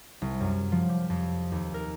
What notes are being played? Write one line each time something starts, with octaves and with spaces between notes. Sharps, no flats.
C2
F#2
F3
G4
F2
D#2
A#4